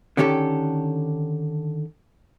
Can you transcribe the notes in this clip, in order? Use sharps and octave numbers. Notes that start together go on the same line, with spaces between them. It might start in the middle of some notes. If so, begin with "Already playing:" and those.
D3 D#3 C#4 G4 A4